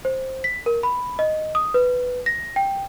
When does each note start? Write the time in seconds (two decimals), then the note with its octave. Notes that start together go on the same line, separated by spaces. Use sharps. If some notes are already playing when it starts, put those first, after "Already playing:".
0.05 C5
0.44 B6
0.66 A#4
0.83 B5
1.19 D#5
1.55 D#6
1.74 B4
2.26 A#6
2.56 G5